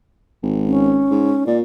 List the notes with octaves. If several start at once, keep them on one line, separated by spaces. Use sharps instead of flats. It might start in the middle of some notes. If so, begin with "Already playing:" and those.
G#1
C#4
G#2
A#2 D5